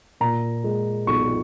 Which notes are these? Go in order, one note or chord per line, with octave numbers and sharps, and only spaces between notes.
A#2 A#5
G#3
B1 C#6